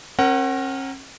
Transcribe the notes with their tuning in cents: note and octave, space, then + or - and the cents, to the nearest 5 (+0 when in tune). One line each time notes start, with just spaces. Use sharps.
C#4 -45 A#4 +0 F#5 +20